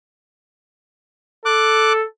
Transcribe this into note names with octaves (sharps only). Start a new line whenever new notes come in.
A4 D6 F#6